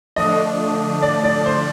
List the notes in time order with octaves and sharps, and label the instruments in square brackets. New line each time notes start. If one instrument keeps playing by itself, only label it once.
[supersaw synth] D3 F3 A3 D4 [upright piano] D#5
[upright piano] D5
D5
C5